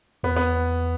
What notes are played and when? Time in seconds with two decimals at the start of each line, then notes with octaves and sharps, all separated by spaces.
0.23 E2 B3
0.36 B3